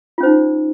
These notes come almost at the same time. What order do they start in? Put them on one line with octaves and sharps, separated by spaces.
F4 C#4 C5 D#4